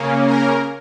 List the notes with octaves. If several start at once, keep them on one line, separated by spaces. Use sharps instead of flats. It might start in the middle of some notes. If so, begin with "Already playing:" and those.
Already playing: C#3 A#3 C#4
A#4